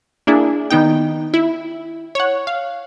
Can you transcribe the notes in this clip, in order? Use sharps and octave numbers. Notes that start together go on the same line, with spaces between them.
A#3 D4 E4 G#4
D#3 B3 D#4 G5
E4
C#5 F#5
F5